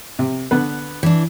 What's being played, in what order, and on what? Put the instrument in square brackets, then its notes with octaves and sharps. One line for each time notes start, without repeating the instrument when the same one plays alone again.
[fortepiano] C3
D3 B3 B4
[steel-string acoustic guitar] E3 D4